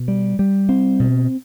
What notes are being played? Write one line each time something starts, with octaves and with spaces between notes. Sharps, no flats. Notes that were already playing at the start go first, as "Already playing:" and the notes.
Already playing: B2
G3
G3
C4
B2